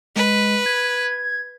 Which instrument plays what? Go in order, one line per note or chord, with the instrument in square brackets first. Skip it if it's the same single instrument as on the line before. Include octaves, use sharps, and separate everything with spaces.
[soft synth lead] G#3 [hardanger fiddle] B4
[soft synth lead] G#6